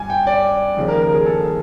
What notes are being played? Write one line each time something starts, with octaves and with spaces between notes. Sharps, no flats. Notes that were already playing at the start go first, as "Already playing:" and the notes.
Already playing: G2 G#5
G5
D5
D#2 C#3 F3
A#4
A#4
G#4
A4